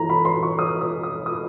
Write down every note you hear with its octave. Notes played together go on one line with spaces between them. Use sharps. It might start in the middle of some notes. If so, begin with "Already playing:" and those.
Already playing: E3 A#5
B5
C6
C#6
D#6
D#6
D#6
D#6